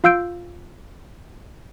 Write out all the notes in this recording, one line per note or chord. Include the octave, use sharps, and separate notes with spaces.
F4 F5 E6 G6 D7